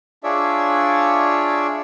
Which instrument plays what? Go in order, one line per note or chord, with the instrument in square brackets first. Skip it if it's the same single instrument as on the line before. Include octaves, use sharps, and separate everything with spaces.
[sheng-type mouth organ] D4 F4 G#4 C#5 D5 E5